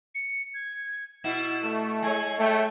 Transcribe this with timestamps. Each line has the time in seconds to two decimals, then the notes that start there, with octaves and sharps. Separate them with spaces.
0.15 C#7
0.54 G#6
1.24 B2 E4 E7
1.64 A3
2.02 G#3 C#5 G#5
2.39 A3 G5